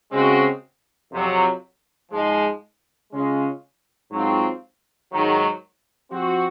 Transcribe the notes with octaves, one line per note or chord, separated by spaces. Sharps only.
C#3 G#3 C4 F#4
F2 C3 F#3
G#2 F3 G#3
C#3 G#3 C#4 F4
G#2 F#3 C4 F4
G#2 D#3 F#3
F3 C4 F#4